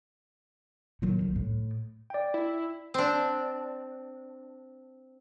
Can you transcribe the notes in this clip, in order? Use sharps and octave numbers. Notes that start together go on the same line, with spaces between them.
D#3 F#3
C2
A2
D5 G5
E4
C4 D4